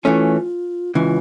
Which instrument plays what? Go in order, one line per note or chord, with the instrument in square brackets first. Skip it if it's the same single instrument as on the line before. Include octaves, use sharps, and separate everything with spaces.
[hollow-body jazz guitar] E3 A3 C#4 [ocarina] F4
[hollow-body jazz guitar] C#2 C#3 E3 [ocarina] F4